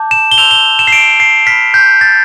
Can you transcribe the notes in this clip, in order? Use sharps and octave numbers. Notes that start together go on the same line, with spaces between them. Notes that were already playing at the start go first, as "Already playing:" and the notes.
Already playing: A5 D6 G6
E7
G7
C6 E6 G6 F7
G7
E7
C7
D7
C7
B5 F6 B6
G6
A6